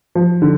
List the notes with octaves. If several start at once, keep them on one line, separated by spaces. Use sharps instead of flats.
F3
D3